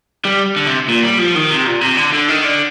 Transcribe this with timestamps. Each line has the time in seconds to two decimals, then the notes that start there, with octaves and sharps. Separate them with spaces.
0.25 G3
0.56 D3
0.66 C3
0.88 A#2
1.03 G3
1.19 F3
1.35 D#3
1.51 C3
1.66 A#2
1.81 C3
1.97 D3
2.12 D3
2.28 D#3
2.44 D3